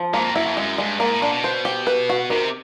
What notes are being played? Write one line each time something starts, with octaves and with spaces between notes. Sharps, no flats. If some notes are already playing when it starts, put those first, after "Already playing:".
Already playing: F3
G#2 A#3
F2
F#2 E4
F2
F#2 G#3
G2 G#3
G#2 A#3
A2
A#2 D4
B2
C5
G4
B4
F#4
C3 D#3